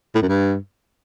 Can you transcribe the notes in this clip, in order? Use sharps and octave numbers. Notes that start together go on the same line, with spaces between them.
A2
F#2
G2